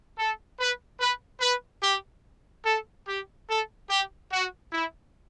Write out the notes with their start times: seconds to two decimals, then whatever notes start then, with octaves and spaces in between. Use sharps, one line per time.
0.18 A4
0.59 B4
1.00 B4
1.41 B4
1.82 G4
2.65 A4
3.07 G4
3.48 A4
3.89 G4
4.31 F#4
4.72 E4